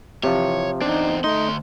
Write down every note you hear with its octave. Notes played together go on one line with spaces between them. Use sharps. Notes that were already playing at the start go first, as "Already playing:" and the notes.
C3 E3 F3 C#5
E2 C4 D4 D#4
D2 A3 D#4 C6